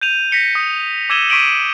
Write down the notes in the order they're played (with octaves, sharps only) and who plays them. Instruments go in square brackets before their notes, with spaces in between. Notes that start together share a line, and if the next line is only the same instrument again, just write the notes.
[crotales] G6 D#7 F7
A#6 B6 C#7 G7
D#6
D6 E6 G#6 D#7 E7 G7
C#6 D6 B6 D7 D#7 F#7